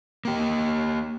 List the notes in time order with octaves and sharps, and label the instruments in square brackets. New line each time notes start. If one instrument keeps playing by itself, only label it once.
[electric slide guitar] A#3 G4